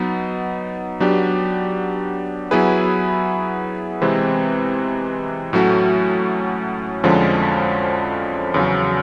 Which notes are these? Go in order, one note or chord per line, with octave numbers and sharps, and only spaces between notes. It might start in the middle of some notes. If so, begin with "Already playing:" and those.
Already playing: F#3 B3 D#4
F#3 B3 D4 G4
F#3 B3 E4 G#4 B4
C3 E3 G#3 C4
A2 F#3 A3 C#4 F#4
F2 D3 F3 G#3 C#4
E2 C#3 F#3